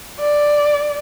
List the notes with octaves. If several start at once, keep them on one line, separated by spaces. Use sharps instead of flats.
D5